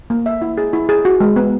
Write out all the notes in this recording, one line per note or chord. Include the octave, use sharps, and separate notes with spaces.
A#3
E5
E4
G#4
E4
G#4
F#4
G#3
B3